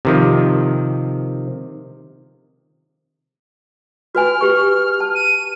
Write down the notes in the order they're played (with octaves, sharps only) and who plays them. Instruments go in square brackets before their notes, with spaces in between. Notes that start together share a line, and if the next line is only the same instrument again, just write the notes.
[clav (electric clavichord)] C3 D#3 F3
[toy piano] F#4 B4 G#5 [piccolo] F6
[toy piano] G4 B4 C#6
A5
[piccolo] D#7